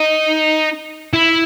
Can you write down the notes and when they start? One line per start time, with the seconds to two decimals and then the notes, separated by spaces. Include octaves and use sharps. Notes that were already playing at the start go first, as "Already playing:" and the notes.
Already playing: D#4
1.13 E4